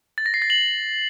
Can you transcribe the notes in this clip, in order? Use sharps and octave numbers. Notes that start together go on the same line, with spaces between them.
A6
A#6
C7
A6
F#7